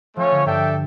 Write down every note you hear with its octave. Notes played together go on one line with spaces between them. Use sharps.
F3 A3 C#4 F4 C#5
D3
G2 D4 A4 E5 G5